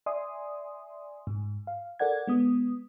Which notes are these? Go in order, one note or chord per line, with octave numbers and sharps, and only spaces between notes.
D5 E5 G#5 C6 D#6
G#2
F5
A4 A#4 D5 F#5 G#6
G#3 B3 D#6